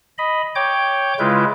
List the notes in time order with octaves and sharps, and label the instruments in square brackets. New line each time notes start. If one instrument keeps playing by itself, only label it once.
[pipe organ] D#5 B5
C#5 G5 D6 G6
C#3 G#3 E4 F4 B4